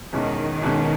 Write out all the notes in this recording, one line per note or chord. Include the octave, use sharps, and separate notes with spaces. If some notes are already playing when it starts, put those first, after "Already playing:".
E2 B2 D#3 G#3 C#4
E2 B2 G#3 C#4